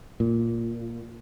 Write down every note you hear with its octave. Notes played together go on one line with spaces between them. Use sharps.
A#2